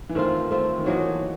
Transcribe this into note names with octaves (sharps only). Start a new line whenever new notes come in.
E3
D#3 A3 C4 F4
A3 C4 F4
D#3
E3 F#3 A#3 D#4 F#4